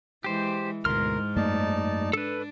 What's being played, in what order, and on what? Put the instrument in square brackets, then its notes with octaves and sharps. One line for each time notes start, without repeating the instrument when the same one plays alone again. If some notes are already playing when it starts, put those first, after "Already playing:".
[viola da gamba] E3 G#3 [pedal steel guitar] G4 C5
[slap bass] D2 B2 [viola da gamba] G#2 [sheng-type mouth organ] A#4 [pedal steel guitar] C6 F6
[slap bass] F#2 A3 A#3 [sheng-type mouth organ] D#4 D5 A5
[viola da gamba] D4 [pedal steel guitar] A4 B4